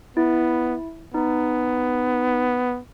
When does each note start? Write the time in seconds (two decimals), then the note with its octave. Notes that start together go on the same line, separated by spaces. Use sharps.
0.17 B3 E4
1.14 B3 D#4